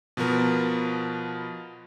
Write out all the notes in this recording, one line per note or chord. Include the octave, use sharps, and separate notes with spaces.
B2 F3 B3 A#4